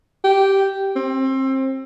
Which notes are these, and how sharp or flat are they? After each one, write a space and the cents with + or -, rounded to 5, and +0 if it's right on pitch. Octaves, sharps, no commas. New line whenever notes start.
G4 -5
C4 +25